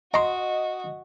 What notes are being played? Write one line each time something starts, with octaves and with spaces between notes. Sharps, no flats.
F#4 D#5 A#5 C6